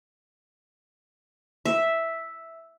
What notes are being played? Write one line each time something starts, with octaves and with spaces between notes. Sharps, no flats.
E5